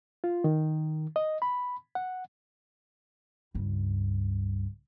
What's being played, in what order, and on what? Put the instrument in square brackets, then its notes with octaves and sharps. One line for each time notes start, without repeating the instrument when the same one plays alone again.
[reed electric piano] F4
D#3
D#5
B5
F#5
[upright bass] C#2 G2